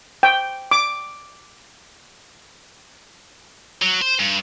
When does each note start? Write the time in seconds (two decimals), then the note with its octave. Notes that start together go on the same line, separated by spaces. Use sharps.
0.23 G5
0.71 D6
3.82 F#3
4.02 C5
4.20 G2